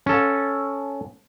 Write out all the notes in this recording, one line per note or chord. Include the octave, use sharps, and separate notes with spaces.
C#4 A4